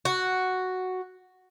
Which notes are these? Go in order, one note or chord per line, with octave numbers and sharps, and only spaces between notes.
F#4